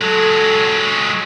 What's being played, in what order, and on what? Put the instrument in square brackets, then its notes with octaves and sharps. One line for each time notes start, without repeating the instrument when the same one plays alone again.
[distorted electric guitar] F#3 G#3 [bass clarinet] A4